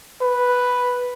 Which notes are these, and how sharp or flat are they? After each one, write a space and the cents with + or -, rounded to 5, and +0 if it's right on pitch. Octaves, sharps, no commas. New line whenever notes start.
B4 +0